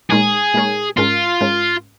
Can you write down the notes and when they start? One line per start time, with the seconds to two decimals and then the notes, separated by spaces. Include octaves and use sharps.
0.11 A#2 G#3 D#4 G#4 A#4 C#5
0.54 A#2 G#3 D#4 A#4 C#5
0.97 G#2 G#3 C#4 F4 A#4
1.41 G#2 G#3 C#4 A#4